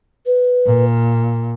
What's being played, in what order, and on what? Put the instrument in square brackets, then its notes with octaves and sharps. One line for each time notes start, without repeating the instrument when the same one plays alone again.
[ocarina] B4
[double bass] A#2